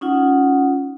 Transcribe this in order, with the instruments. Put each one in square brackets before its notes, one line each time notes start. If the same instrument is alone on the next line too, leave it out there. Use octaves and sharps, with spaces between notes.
[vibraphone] C#4 D#4 F4 F#5